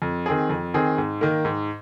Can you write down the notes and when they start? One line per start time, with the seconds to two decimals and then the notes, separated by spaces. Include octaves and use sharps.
0.02 F2
0.26 D#3 C4 G#4
0.50 F2
0.74 D#3 C4 G#4
0.98 G#2
1.21 D#3 A#3
1.45 G#2